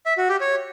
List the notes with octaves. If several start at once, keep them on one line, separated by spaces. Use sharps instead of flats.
E5
F#4
G4
C#5